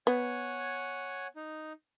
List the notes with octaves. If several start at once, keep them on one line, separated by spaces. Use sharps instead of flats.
B3 C#5 F#5 G#5
D#4